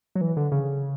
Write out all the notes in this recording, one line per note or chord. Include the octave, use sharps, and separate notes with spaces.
F#3
E3
D3
C#3